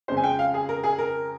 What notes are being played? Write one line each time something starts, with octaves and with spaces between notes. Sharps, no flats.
F2 C#3 G#3 C5
G#5
G5
F5
G#4
A#4
G#4
A#4